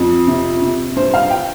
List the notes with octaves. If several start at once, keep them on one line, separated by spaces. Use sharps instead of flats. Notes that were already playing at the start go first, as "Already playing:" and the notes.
Already playing: F2
C3
C3
G2 C5
F5
G5